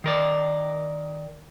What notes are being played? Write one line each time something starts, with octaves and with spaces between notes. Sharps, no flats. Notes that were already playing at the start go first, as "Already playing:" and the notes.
D#3 A#4 D5